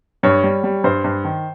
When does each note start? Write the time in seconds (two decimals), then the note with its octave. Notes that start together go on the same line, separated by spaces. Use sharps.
0.23 G2 C#5
0.44 G3
0.64 G3
0.84 G2 C5
1.04 G2
1.24 D#3